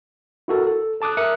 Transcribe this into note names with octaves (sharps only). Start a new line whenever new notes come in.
E4 F#4 A4 A#4
A4
A4 A5 D6 D#6 F#6
A#4 E5 D#6 F#6 C#7